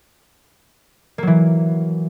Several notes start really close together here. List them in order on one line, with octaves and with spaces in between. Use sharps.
A#3 F#3 E3